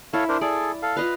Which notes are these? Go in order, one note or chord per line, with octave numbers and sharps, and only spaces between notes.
E4 A4 C#5 F5
D4 A#4 C5
G#4 A4 D5
A4 F5
F4 B4 D#5 F5